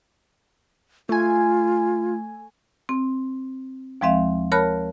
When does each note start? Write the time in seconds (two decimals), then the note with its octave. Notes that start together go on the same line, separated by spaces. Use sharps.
1.09 A3 F4 G#5
2.89 C4
4.01 D#2 F3 G#3 C4 E5 F5
4.52 A#4 C#5 A5 B5 F6 F#6